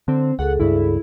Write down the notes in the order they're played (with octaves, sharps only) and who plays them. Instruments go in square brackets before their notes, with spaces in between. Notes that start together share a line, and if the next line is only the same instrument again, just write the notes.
[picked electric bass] D3 [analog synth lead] C4
[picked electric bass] C#2 [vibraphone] G#4 A4 [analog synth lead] F#5
[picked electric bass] C#2 G2 [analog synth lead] E4